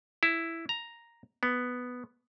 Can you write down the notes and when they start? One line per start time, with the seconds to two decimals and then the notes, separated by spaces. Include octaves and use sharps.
0.23 E4
0.69 A#5
1.43 B3